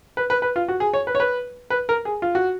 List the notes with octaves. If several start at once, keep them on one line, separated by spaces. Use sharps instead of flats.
B4
B4
B4
F4
F#4
G#4
C#5
B4
C#5
B4
B4
A#4
G#4
F4
F#4